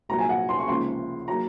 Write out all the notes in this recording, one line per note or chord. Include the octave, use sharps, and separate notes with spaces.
C2 A#2 F#3 A#3 A#5
G#5
F#5
C6
C#6
C#2 C3 F3 A#3 C6
F#3 A#3 A#5